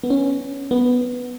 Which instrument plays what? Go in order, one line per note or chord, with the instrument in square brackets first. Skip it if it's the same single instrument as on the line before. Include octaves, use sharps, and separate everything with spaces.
[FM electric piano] B3
C#4
B3